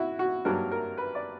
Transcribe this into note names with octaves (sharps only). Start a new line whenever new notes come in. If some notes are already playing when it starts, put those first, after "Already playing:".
Already playing: E4 F#4
F#4
G2 F#3 A#3 A#4
A#4
B4
D5